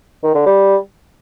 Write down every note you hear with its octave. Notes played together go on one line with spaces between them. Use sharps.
D#3
D3
G3